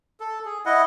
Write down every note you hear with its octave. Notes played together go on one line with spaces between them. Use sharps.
A4
G#4
E4 D#5 F#5